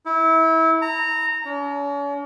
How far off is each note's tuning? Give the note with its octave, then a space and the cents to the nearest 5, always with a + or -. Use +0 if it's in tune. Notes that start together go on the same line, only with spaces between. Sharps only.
E4 -25
A#5 -20
C#4 +40